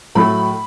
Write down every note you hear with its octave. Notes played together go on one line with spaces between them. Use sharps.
A2 F#3 A3 B5